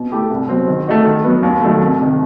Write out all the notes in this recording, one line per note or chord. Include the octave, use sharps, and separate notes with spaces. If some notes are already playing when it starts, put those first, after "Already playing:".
Already playing: B2
A3 E4 G4
C2
B2 F#3 C4
D#3
A3 D#4 F#4
D#3
F#3 B3
D#2
D#3 F#3 A3
C2
C3 D#3